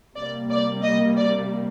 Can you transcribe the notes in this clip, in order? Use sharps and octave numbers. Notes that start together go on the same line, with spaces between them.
C3 G3 A#3 D5
D5
D#5
D5